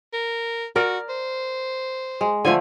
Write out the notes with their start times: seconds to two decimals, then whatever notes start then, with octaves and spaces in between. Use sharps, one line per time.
0.13 A#4
0.76 F#4 A#4 D5
1.09 C5
2.21 G#3
2.45 D3 F3 A3 G#5